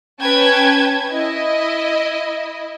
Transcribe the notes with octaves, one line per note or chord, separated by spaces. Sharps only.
C#4 B4 G5 A5 G#6
E4 D#5